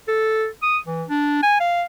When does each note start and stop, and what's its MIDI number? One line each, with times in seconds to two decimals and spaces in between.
0.08 0.47 69
0.63 0.78 87
0.87 1.04 52
1.09 1.43 62
1.43 1.60 80
1.60 1.83 77